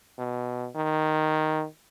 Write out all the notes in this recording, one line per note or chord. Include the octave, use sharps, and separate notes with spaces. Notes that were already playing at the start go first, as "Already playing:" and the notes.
B2
D#3